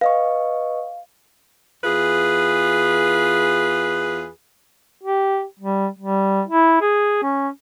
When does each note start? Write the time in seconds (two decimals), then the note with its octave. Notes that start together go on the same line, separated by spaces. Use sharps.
0.01 B4 D#5 F5 C#6
1.83 E2 F4 G#4 B4
5.03 G4
5.59 G3
5.99 G3
6.47 E4
6.81 G#4
7.23 C#4